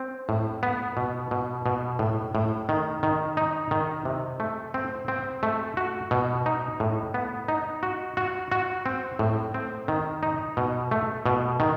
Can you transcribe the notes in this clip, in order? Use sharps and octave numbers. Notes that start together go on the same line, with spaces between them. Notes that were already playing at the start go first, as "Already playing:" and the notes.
Already playing: C4
A2
B3
B2
B2
B2
A2
A2
D#3
D#3
D#4
D#3
C3
A3
C4
C4
A3
F#4
B2
D#4
A2
B3
D#4
F#4
F#4
F#4
C4
A2
C4
D#3
D#4
B2
A3
B2
D#3